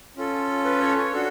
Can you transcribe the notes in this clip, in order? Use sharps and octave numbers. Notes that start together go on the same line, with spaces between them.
C#4 F4 A4
B4
C#5
C#5
D4 F#4 A4